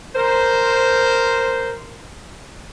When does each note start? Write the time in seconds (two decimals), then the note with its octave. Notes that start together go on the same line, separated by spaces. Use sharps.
0.16 A#4 C5